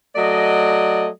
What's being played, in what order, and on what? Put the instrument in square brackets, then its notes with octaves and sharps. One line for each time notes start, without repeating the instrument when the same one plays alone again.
[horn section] F#3 A3 D5 D#5